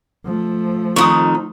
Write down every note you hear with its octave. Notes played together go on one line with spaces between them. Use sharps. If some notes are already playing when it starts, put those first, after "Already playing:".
F3 A3
F2 D#3 C#6 D#6